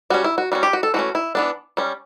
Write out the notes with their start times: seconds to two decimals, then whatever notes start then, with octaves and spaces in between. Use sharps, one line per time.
0.10 G3 C#4 F#4
0.24 E4
0.38 F#4
0.52 G3 C#4 F#4
0.63 G4
0.73 F#4
0.83 A4
0.94 E3 A3 C#4 F#4
1.15 E4
1.35 E3 B3 D4
1.77 G3 C#4